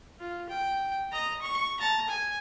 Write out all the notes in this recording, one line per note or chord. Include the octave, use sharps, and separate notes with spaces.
F4
G5
D#5 A#5
C#6
A5 A#5
G#5